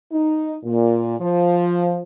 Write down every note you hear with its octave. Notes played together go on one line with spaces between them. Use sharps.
D#4
A#2
F3